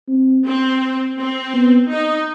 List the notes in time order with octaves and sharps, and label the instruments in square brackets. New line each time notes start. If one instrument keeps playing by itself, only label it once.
[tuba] C4
[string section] C4
C4
[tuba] B3
[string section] D#4